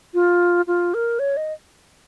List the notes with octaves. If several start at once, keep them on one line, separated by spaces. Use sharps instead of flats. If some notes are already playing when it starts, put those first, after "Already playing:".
F4
F4
A#4
C#5
D#5